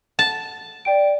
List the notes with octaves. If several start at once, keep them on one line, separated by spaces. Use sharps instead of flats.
A5
D5 G5 D7